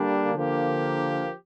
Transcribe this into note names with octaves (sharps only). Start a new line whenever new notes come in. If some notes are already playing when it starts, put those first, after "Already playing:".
Already playing: D3 G3 A#3 D4
D3 F3 A#3 G4